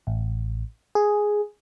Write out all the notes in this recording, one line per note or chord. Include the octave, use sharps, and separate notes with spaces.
A1
G#4